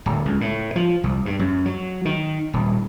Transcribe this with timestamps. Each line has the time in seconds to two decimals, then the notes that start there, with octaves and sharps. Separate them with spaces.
0.06 D1
0.25 C#2
0.41 A2
0.76 F3
1.04 C2
1.26 G2
1.39 F#2
1.65 F#3
2.05 D#3
2.53 D#1